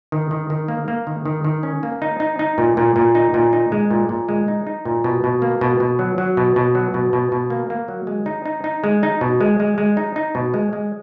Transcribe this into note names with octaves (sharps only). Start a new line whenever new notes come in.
D#3
D#3
D#3
A#3
A#3
D#3
D#3
D#3
C#4
A#3
D#4
D#4
D#4
A#2
A#2
A#2
D#4
A#2
D#4
G#3
A#2
A#2
G#3
D#4
D#4
A#2
B2
B2
A#3
B2
B2
F#3
F#3
B2
B2
F#3
B2
B2
B2
A#3
A#3
F#3
G#3
D#4
D#4
D#4
G#3
D#4
B2
G#3
G#3
G#3
D#4
D#4
B2
G#3
G#3